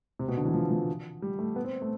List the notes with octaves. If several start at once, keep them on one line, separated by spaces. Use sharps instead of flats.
C3
B2
D3
E3
F3
F3
G3
A3
B3
C4
A3